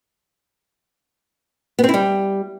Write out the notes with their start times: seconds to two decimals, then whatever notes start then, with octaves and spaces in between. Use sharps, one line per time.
1.79 B3
1.84 C4
1.89 E4
1.94 G3